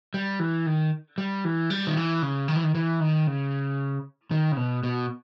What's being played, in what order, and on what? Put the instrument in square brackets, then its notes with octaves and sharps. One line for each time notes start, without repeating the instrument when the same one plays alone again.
[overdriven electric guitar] G3
E3
D#3
G3
E3
G3
D#3
E3
C#3
D#3
E3
D#3
E3
D#3
C#3
D#3
C#3
B2
B2